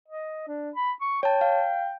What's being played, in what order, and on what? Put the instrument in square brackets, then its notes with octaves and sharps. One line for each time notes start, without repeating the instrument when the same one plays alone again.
[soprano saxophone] D#5
D4
B5
C#6
[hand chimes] C#5 A5 [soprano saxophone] G5
[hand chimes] F5